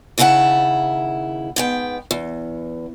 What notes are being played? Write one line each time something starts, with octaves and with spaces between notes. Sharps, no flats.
D#2 C#3 E4 F5 F#5 A5
G#2 B3 G5
E2